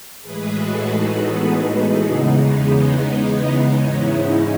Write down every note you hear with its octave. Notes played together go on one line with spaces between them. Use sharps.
A2 E3 G#3 G#4 B4
F#4 A4
D#4 F#4
B3 D#4
E2 C#3 E3 G#3
G#2 E3 G#3 C#4 E4
C#4 E4